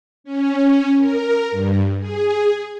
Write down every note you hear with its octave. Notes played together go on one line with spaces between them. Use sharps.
C#4
A#4
G2
G#4